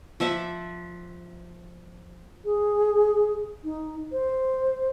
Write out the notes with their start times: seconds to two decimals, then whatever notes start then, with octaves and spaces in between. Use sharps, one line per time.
0.20 F3 E5 F#5 D6
2.45 G#4
3.64 D#4
4.12 C5